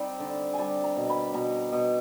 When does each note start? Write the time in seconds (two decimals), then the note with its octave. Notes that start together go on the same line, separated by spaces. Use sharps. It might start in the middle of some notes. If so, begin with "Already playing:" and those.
Already playing: G3 C4 D#4
0.20 D3
0.53 G#5
0.58 G3 A5
0.84 A#5
0.97 B2
1.10 B5
1.34 B2 A#5
1.72 B2